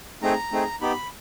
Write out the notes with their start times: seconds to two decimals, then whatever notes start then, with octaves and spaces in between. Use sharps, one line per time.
0.22 A3 C4 D#4 G#4 A#5
0.52 A3 C4 D#4 G#4
0.81 B3 D#4 G4 B5